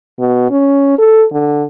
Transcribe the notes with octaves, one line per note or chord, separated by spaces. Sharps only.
B2
C#4
A4
D3